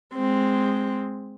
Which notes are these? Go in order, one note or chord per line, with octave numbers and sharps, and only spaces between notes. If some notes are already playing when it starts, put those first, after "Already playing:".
G#3 C4